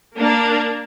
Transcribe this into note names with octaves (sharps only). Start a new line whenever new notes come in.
A#3 D4